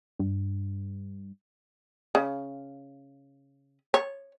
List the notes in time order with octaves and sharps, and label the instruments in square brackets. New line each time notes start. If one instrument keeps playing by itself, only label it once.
[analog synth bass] G2
[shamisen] C#3
C#5